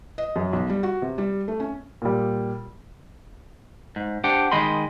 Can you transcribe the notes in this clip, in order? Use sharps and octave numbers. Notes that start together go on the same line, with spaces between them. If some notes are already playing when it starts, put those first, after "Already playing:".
D#5
F#2
B1
G3
F#4
C3
G3
A3
C#4
A#2 G3
G#2
D4 G4 C5 F#5 G5
D#3 G#3 D#5 B5 C6